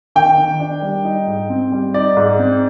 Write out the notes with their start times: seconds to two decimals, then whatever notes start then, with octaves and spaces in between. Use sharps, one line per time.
0.16 D#3 G5
0.38 D#3
0.60 D4
0.82 G3
1.05 D#4
1.27 G#2
1.50 C4
1.72 G3
1.94 D#4 D5
2.17 G#2
2.39 C4